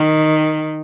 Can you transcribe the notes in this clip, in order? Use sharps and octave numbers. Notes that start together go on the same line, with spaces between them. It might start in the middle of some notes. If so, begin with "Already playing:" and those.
Already playing: D#3